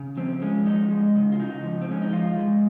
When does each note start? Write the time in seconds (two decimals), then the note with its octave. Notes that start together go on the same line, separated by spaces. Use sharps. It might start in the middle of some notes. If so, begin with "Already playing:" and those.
Already playing: C#3
0.17 F3 C4
0.42 G#3 C#4
0.66 F3 D#4
0.91 G#3
1.15 C#3
1.32 F4
1.39 C#3 D#4
1.63 F3
1.82 C4
1.89 G#3 C#4
2.02 D#4
2.12 F3 F4
2.37 G#3